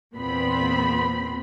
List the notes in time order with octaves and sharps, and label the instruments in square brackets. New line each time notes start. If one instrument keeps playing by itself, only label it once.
[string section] E2 A#2 B3 C4 B5 C6